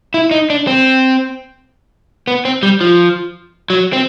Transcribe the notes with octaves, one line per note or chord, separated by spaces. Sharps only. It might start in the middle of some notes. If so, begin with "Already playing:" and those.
E4
D#4
D4
C4
B3
C4
G3
F3
F#3
C4